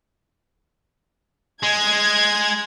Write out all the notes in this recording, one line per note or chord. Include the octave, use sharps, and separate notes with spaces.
G#3 G#6